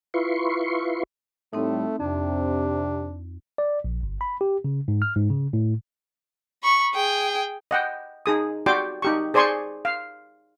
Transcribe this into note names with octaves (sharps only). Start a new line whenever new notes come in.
E4 F4 B4 C6 C#6
A2 G3 A3 C4 D#4 A4
F2 C3 D4
D5
A#1
G1
B5
G4
C#3
G#2
F6
G#2
C#3
A2
B5 C#6
G#4 G5
D#5 F#5 G5
D#4 G#4 D#6
F#4 G4 D5 G5 C6 D6
D#4 G4 C#6
G#4 C5 D5 G#5 C6 C#6
F5